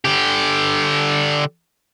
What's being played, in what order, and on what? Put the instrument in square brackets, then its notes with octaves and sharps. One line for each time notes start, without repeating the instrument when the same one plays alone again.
[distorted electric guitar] D3 G4